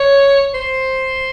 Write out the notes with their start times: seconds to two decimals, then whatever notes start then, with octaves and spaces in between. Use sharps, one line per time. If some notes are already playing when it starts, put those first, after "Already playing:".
Already playing: C#5
0.54 C5